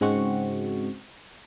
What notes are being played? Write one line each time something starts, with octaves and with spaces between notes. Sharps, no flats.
G#2 C#3 G#3 C4 F#4 C#6